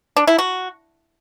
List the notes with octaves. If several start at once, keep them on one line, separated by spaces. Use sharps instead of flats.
D4
E4
F#4